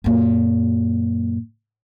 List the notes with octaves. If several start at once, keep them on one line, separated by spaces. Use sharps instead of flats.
F#2 A#2